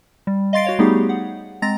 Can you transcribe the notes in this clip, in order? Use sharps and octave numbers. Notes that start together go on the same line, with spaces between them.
G3
D#5 F5 C6 A6 C7 D7
F#4 C#5 F5
G3 A3 B3 D#4 G4 G#4
F#5
G#3 C4 A#5 A6 A#6